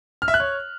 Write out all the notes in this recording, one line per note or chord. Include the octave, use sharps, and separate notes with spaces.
F6
E5
F#6
C#5